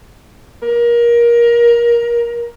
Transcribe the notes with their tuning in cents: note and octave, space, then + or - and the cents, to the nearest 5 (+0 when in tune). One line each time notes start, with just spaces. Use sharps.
A#4 +20